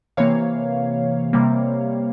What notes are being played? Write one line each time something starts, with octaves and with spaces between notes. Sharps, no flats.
C3 E3 A#3 C#5 F5
C3 G3 A#3